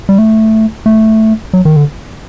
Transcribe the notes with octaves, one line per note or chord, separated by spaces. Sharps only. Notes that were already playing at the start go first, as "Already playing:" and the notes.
G3
A3
A3
F#3
D#3
D3